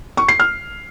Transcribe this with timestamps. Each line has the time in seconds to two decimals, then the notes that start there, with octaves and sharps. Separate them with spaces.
0.17 C#6
0.28 C7
0.40 F6